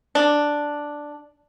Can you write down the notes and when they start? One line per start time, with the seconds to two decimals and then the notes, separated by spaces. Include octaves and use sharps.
0.15 D4